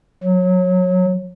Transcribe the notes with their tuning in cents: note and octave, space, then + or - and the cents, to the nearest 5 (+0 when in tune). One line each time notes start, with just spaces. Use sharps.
F#3 -20